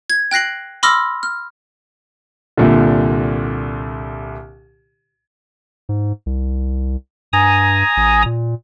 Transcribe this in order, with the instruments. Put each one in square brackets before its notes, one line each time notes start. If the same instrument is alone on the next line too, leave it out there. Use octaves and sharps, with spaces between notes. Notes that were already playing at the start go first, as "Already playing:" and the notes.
[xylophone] G#6
G5 F#6 A#6 C7 F#7
B5 C6 D6 E6 F6 A#6
F6
[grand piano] C2 A#2 D3
[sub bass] G#2
C2
[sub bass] G2 [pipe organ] G#5 A#5 D#6
[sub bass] A1
A#2